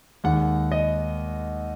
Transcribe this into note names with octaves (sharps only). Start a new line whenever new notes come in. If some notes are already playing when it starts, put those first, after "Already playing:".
D#2 D#3 G#3 F#5
D#5